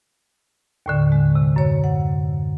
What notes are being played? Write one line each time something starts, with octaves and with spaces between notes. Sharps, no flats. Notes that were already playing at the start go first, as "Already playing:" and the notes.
D#2 A2 D3
G#3
C3
F#2 C#5
F#5